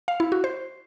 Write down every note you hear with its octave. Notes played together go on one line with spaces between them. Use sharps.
F5
E4
F#4
C5